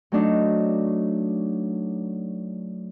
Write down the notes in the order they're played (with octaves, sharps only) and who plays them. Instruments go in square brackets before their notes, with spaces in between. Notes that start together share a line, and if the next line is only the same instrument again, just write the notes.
[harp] F#3 A3 D4 D#4